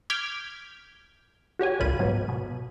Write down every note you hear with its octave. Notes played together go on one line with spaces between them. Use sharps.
D6 F6 G6 G#6 B6
F#4 G4 C#5 G#5
G1 C#2 A#2 F4 B5 D#7
G#2 B2 F#3 B3
B2